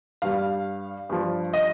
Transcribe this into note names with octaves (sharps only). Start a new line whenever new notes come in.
G2 G3 F5
G2 F3
D#5